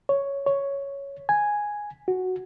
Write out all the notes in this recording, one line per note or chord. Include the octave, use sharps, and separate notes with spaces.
C#5
C#5
G#5
F#4